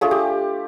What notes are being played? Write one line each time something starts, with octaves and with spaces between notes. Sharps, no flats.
A3 D4 F4 G#4
G4